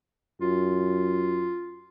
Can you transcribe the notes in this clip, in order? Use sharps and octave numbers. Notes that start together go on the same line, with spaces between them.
F#2 F4